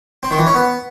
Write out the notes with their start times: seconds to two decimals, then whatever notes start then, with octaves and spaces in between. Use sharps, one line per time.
0.23 C4
0.31 D#3
0.39 E3
0.47 C#4
0.54 B3